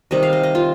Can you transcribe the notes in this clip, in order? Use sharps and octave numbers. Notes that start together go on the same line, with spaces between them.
C3 D#3 G3 D#5
F5
D#5
D#5
F4